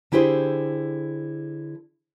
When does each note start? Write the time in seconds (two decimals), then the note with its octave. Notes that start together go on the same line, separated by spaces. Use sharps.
0.12 D3 E4 G4 G#4 C5